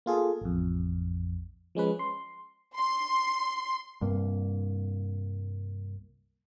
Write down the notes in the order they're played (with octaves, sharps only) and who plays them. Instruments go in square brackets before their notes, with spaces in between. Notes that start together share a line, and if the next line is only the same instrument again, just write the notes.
[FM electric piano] A#3 F4 G#4 A4
A1 F2
F3 G#3 C#4 B4
C6
[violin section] C6
[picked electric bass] C2 G2 A#3